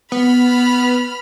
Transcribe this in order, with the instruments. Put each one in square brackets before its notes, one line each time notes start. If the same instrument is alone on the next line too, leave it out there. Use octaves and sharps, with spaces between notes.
[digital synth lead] B3 [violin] B5 F6